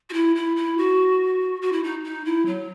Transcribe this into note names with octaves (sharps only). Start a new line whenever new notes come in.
F#4
E4
E4
E4
F#4
F#4
E4
D#4
D#4
E4
F#3